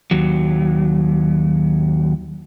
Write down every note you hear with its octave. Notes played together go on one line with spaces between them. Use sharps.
D#2 F#3